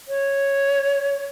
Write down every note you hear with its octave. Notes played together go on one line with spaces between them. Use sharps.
C#5